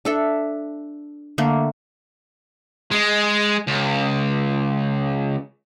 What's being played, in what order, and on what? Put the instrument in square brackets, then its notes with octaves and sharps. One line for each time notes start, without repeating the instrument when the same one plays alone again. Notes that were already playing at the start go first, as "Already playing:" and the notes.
[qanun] D4 A4 E5
D3 A3 A#3
[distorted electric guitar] G#3
C#2